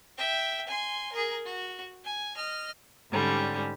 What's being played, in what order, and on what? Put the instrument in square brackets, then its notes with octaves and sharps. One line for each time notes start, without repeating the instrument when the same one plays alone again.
[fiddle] E5 G5
G#5 C6
G#4 A#4
F#4
G#5
D#5 F6
[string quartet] G#2 D3 G3 C#4